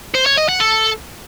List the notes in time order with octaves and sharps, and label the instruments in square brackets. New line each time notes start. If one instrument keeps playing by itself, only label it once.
[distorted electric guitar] C5
C#5
D#5
F#5
A4